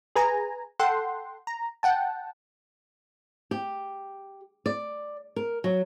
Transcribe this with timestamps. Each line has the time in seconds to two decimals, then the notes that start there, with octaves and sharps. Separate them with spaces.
0.15 G#4 B4 G#5 A#5
0.79 A4 F#5 G5 C6
1.47 A#5
1.83 F#5 G5 A5
3.51 G4
4.66 D5
5.36 A#4
5.64 F#3